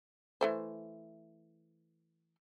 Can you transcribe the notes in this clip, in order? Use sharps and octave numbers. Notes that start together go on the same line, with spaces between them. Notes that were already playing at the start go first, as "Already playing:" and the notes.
E3 A3 C5